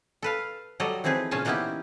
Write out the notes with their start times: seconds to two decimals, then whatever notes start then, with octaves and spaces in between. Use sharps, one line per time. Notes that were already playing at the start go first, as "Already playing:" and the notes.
0.22 A4 B4 F5
0.80 F#3 G3 A4 D5 D#5
1.04 E3 F3 C4 D#4 G#4 B4
1.31 A#2 C#3 C#4 F4 G#5 A5
1.45 E3 A#3 B3 D#4 E4 G4